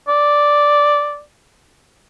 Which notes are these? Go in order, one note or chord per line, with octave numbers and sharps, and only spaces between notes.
D5